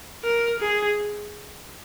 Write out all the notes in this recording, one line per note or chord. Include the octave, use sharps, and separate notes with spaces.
A#4
G#4